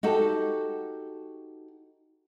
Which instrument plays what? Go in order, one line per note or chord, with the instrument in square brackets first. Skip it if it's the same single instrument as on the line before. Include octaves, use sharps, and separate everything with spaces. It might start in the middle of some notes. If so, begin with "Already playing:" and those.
[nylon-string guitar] D#4 F#4 G4 A4